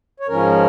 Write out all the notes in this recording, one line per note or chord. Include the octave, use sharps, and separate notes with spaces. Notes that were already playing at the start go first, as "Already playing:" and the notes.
C#5
G#2 F3 C#4 A#4